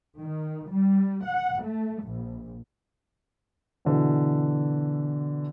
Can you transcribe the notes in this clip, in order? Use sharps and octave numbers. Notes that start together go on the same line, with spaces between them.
D#3
G3
F#5
A3
A#1
B2 D3 E3